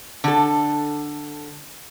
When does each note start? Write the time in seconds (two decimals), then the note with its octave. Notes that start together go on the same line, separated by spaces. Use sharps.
0.24 D3 A4